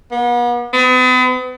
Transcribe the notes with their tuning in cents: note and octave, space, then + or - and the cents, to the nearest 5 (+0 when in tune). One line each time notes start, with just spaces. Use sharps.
B3 -40
B3 +40